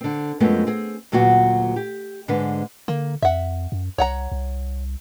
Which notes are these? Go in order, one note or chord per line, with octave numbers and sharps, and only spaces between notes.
D3 C4
F#2 F3 G#3 A3 B3 C4
C4 G#4
D2 A#2 F#3 B3 F#4 F#5
G4
G#2 D3 G#3 B4
D3 A#3
F2 E5 F#5
F#2
C2 C#5 F#5 A#5
C2